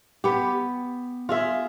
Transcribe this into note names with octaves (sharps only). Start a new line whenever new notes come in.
B3 G4
F4 G#4 E5